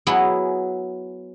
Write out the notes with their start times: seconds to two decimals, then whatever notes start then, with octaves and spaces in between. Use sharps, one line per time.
0.07 F#3 B3 E4 G#4